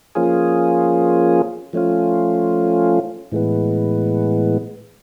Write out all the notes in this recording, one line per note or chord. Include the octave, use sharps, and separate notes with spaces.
F3 A#3 C#4 F4 G#4
F3 A3 C#4 F4
A2 E3 G#3 B3